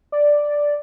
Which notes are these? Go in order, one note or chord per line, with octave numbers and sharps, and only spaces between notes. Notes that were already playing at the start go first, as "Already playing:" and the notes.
D5